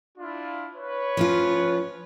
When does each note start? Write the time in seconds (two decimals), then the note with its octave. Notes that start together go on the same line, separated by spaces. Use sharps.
0.18 D4 E4 F4
0.75 B4 C#5
1.17 F3 C#4 F4